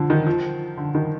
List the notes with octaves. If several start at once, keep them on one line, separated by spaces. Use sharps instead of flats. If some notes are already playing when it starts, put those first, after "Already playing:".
Already playing: D3 F3
D#3
F3
D3
D#3